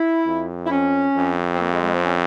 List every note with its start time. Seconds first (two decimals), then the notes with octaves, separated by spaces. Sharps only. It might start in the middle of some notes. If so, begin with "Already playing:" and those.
Already playing: E4
0.26 F2
0.66 E4
0.71 C#4
1.16 F2
1.55 C4
1.60 A#3
1.72 G#3
1.82 G#3
1.94 C4
2.05 C#4